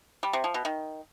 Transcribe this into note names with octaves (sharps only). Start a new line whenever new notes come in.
G3
C3
F3
B2
D#3